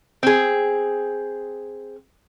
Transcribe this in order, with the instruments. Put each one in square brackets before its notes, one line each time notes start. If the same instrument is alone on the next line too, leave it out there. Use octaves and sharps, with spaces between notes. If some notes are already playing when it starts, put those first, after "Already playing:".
[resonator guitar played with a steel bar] C4 G#4